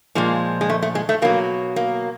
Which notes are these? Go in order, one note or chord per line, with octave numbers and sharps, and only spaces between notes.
A#2 F3 G#3 A#3
G#3
A3
A3
G#3
A3
B2 F#3 A#3
A#3